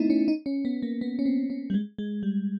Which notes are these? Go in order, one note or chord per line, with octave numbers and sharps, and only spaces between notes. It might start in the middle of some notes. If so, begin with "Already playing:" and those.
Already playing: A3 B3 C4 D#4 E4
C#4
D#4
C#4
B3
A#3
B3
C#4
C4
C#4
G3
G#3
G#3
G3